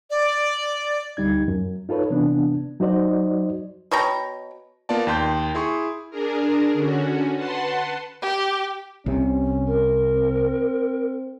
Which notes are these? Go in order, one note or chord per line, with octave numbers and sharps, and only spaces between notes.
D5
D2 G3 D#4 G#6
F#2
D#4 F4 A4 B4 C#5
C3 E3 B3 D4
F#3 D#4 F#4 C5 D5 D#5
B2 C#5 G5 A#5
A#3 B3 F4 D5 A5
D#2 G5 C6 G6
E4 G#4 C6 C#6
D4 G#4 A#4
D3 C#4 F#4
B4 F#5 A5 C6
G4
C2 C3 C#4
A#4
C4